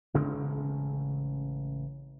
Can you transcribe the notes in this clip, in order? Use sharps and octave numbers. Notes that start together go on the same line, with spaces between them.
A1 C#3 G#3 C4